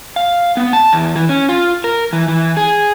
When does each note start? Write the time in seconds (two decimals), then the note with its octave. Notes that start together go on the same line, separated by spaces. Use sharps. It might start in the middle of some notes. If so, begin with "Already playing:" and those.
0.16 F5
0.57 B3
0.73 A5
0.93 E2
1.16 E3
1.29 C#4
1.49 F4
1.84 A#4
2.13 E3
2.28 E3
2.57 G#4